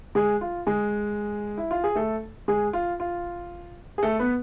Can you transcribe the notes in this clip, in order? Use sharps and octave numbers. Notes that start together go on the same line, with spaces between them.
G#3 G#4
F4
G#3 G#4
E4
F4
G#4
A3 A4
G#3 G#4
F4
F4
G#4
A3 A4
B3 B4